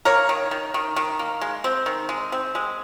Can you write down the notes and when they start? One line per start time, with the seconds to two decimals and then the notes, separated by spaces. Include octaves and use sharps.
0.05 A#3 A#4 C#5
0.29 D#3
0.51 D#3
0.74 D#3
0.96 D#3
1.19 A#3
1.41 G#3
1.64 C4
1.86 D#3
2.09 G#3
2.32 C4
2.55 G#3